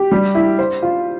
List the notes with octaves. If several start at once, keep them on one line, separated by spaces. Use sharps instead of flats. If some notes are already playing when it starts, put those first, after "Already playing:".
Already playing: G4
G3
E4
C5
F4